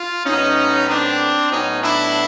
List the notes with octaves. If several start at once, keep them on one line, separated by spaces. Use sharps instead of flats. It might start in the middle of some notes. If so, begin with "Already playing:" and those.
Already playing: F4
A2 F#3 B3 C#4 D#4
C4 D4
A2 F#3 B3 C#4 D#4
D4 E4